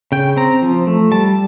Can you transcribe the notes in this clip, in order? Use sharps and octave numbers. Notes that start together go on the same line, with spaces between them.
C#3 G5
C4 A#5
F3
A3
G3 A5